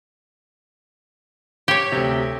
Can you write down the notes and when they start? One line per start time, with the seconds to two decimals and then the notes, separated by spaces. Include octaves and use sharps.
1.68 G4 C#5
1.92 D2 C3